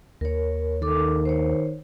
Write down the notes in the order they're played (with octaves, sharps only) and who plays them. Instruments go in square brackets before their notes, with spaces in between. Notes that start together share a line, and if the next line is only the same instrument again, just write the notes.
[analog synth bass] D#2 [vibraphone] A#4 C#5
[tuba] D#3 [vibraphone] A4 D6
[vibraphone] C5 C#5